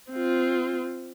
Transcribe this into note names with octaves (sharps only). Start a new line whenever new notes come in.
C4 F4